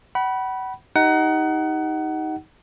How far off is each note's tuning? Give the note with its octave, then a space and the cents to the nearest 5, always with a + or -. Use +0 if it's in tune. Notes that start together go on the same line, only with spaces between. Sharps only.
F#5 +35 B5 -15
D#4 +10 G4 +0 F#5 +25